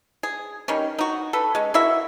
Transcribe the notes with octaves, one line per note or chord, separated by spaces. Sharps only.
G#4
D#3 G3 C#4
D#4 F#4
A4 B4
G#3 C#4
A#3 E4 F#4 E5